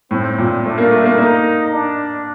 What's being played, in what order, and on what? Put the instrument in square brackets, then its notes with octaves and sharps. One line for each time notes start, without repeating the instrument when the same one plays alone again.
[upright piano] A2 [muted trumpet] C4
[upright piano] A#2
[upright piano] A3 [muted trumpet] D4
[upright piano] A#3
A3
A#3
[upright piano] A#3 [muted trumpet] D#4
[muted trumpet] D4